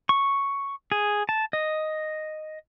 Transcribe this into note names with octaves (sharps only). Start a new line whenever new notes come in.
C#6
G#4
A5
D#5